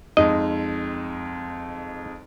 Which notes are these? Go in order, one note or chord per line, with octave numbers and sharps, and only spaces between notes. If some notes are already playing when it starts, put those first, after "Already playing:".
F2 G#3 D#4 D#5